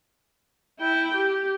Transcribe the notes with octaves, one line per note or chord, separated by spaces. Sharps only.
E4 G5
G4